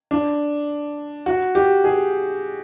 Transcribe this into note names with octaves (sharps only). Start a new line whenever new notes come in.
D4
F#4
G4
G#4